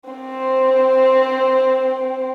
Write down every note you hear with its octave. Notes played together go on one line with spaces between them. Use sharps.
C4 C5